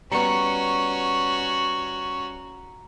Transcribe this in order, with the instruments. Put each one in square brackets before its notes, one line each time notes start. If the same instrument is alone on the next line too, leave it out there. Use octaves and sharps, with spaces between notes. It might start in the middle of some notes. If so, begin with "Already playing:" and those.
[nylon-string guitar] G3 B3 [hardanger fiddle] C#4 F#4 [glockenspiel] A#5 C#7